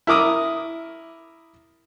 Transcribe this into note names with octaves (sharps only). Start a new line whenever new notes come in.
E4 A#4 D6 D#6